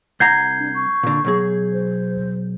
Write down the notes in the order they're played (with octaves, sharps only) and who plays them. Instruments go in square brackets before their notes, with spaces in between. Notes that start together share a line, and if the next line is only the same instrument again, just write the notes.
[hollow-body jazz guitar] C2 F#5 A#5 [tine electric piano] G6 G#6 C7
[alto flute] D4
C#6
[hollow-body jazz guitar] A#2 D3
B2 F#3 G#4
[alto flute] C5